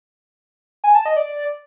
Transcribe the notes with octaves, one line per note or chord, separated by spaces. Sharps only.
G#5
A5
D#5
D5